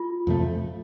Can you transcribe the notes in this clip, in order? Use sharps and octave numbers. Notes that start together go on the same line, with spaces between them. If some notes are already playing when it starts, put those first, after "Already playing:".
Already playing: F4
F2 C3 F3 A3